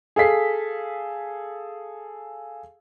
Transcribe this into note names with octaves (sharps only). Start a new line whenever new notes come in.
G#4 A4 F5 B6 C7